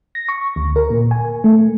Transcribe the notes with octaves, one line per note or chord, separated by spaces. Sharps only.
A#6
C#6
D2
A#4
A#2
G#5
A3